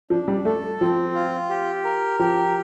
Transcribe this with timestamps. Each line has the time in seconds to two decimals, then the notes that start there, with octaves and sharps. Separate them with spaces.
0.10 F3 D4
0.28 G3
0.45 A3 A4
0.81 F3 C4
1.15 F4
1.50 G4
1.85 A#4
2.19 F3 G4